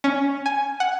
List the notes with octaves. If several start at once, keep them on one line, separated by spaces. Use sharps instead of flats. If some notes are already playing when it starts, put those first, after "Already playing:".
C#4
G#5
F#5